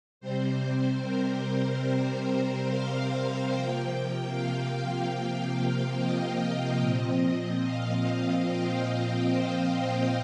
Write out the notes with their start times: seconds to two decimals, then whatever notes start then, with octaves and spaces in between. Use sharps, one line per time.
0.20 C3 G3 C4 C5
1.03 A#4
1.87 C5
2.68 F5
3.51 C3 F3 A#3 G5
4.33 F5
5.98 D#5
6.80 A#2 F3 C4 D#5
7.63 F5
8.46 G5
8.88 F5
9.28 C5